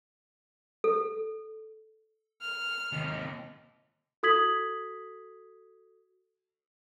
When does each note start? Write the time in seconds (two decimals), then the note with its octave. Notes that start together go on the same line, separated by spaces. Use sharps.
0.84 A4
2.41 F6
2.92 D#2 C3
4.23 F#4 A4 D#6 G#6 B6 F#7